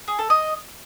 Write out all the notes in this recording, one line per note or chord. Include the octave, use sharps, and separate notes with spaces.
G#4
A4
D#5